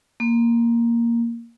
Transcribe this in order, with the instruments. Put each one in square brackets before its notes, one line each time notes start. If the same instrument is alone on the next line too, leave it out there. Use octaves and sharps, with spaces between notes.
[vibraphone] A#3